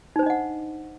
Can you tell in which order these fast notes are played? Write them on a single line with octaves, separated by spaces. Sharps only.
D#4 C5 D4 D#5 F#5